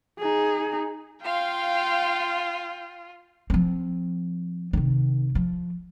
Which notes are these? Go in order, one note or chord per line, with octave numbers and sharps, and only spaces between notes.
D#4 G#4
F4 F5 G5 C6
F3 C4
C3 D#3
F3